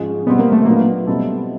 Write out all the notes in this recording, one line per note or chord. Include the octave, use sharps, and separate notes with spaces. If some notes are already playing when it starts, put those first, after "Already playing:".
Already playing: G#2 F3 G#3 C#4
B2 G3 B3 C4
A#3
A3
A#2 F#3 A#3 B3 D4 F4
B2 G3 C4 E4 A4